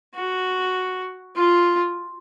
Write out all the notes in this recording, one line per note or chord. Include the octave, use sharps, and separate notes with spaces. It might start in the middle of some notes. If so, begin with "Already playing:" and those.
F#4
F4